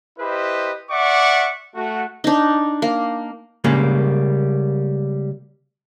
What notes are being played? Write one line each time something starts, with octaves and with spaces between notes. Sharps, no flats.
E4 G4 B4 C5 D#5
D5 E5 F#5 C#6 D6
A3 F#4
D4 D#4
A#3
C#3 G3 G#3 A#3